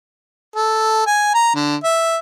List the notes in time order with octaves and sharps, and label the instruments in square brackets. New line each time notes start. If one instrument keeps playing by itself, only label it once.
[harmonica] A4
G#5
A#5
D3
E5